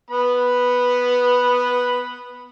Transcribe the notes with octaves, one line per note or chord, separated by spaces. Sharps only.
B3 B5